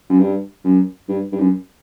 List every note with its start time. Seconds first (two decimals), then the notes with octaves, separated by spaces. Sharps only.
0.10 F#2
0.20 G2
0.64 F#2
1.09 G2
1.32 G2
1.39 F#2